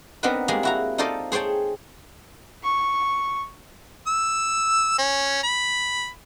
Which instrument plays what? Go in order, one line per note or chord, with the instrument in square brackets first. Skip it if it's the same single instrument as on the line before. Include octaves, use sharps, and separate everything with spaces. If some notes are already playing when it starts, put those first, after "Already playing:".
[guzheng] B3 C4 D4 D#4 A#4 B4
G3 G#3 A#3 G#4
E4 F#4 A#5
D#4 F4 A4 C5 D5 D#5
G#4 C5 C#5 G5 A5
[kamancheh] C#6
[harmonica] E6
C#4
B5